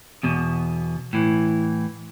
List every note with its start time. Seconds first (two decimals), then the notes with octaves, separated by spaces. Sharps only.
0.23 E2 B2
1.13 A2 E3